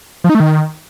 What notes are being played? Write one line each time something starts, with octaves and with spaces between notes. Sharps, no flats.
F3
D#4
A3
D#3